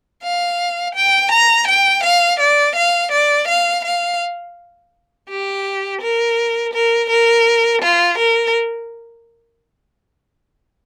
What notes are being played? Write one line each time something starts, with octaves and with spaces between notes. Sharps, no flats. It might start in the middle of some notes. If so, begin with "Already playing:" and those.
F5
G5
A#5
G5
F5
D5
F5
D5
F5
F5
G4
A#4
A#4
A#4
F4
A#4